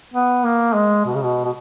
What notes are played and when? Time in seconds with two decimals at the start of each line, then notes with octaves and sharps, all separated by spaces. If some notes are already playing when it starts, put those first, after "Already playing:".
0.14 B3
0.45 A#3
0.74 G#3
1.06 B2
1.15 C#3
1.23 B2
1.45 B2